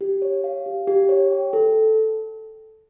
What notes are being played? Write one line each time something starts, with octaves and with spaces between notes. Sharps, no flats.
G4
C#5
F5
G4
G4
C#5
G5
A4